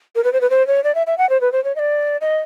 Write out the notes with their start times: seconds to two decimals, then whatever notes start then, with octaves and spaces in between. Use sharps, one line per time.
0.15 A#4
0.24 B4
0.33 C5
0.41 B4
0.50 C5
0.67 C#5
0.84 D5
0.95 E5
1.07 E5
1.18 F#5
1.29 C5
1.41 B4
1.52 C5
1.64 C#5
1.76 D#5
1.79 D5
2.21 D#5